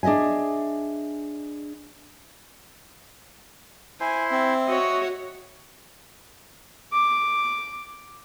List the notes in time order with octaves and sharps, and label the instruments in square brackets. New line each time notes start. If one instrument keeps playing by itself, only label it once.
[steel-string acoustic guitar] D4 G#4 D#5 E5 G#5
[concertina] E4 C5 [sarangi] G#5
[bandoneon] C4 [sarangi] E5
[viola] F#4 C#5 [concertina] D#5
[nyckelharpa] D6